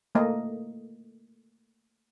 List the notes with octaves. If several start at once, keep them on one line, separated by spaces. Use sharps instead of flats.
A3 A#3 D#5